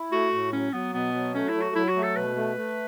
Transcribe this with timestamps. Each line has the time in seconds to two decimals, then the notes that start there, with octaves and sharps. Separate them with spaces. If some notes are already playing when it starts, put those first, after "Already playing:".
Already playing: E4
0.12 A3 F#4
0.33 A2
0.53 F#3 C#4
0.73 F#3 B3
0.94 B2 B3
1.14 F#3
1.34 A3 C#4
1.49 E4
1.55 F#3
1.62 F#4
1.75 F#3 E4
1.89 F#4
1.96 A3
2.03 A4
2.16 B2 B4
2.36 A3
2.57 A3